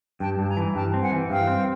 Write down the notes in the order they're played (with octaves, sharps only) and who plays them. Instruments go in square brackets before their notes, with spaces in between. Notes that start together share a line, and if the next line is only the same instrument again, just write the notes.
[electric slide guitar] G2 [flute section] G5 A5
[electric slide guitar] G2 [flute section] A5
[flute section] G#5 A#5
[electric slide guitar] E3
[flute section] G#5
[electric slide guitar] G2 [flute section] G5 A5
[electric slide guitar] C4
[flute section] F#5 G#5
[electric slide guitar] E3
[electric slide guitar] G2 [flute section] F5 G5
[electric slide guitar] C4